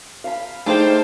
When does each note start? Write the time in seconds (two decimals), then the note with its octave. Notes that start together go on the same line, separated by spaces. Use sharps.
0.24 F5 B5
0.66 A3 D4 D#4 G#4 C5 F5 G5